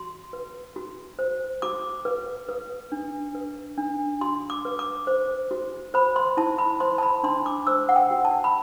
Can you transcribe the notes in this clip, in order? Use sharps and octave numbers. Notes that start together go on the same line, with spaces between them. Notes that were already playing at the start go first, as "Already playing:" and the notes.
Already playing: F#4 C6
B4
F#4
C5
F#4 D6
B4
B4
D4
B4
D4
F#4 C6
D6
B4
D6
C5
F#4
C5 B5
C6
E4 A5
B5
C5 C6
A5
B5
D4 C6
D6
C5 E6
F#5
G5
F#4
A5
B5